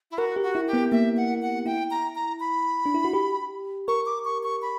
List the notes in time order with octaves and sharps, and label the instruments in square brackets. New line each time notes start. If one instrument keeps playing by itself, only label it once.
[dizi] E4
[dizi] F#4 [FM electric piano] A#4
[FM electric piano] G4
[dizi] F#4
[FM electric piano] E4
[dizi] G4
[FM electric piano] B3
[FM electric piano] A#3 [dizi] E5
[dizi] F#5
F#5
[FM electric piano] E4 [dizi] G5
[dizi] A#5
A#5
B5
[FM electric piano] D4
E4
F#4
G4
[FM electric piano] A#4 [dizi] C#6
[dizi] D6
C#6
C#6
B5